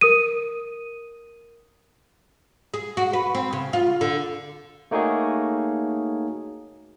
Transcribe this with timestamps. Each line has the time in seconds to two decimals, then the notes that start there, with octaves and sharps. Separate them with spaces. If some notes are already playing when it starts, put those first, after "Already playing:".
0.01 A#4 D#6 D#7
2.74 G#4
2.97 F#4
3.13 B4
3.35 C4
3.53 C#3
3.73 F4
4.01 D3
4.91 A3 A#3 D#4 F#4 G#4 C#5